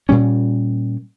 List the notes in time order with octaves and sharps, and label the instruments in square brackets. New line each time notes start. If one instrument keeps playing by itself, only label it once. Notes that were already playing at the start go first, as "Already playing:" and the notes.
[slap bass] A#2 G3 C#4